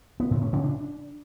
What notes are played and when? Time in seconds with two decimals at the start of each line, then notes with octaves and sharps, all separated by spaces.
0.20 B3
0.31 A2
0.42 C#4
0.53 C#3
0.64 D4